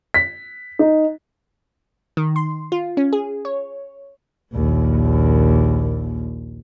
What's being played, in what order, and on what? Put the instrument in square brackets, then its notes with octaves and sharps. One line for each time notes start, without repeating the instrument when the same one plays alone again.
[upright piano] B6
D#4
[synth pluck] D#3
C6
F4
C#4
G#4
C#5
[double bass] A#1 D#2